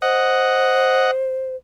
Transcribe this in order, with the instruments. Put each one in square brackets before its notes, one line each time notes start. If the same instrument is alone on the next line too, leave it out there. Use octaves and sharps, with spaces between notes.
[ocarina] C5 [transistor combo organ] D#5 F#5